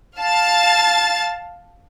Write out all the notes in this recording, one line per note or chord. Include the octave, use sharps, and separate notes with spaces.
F5 A5 A6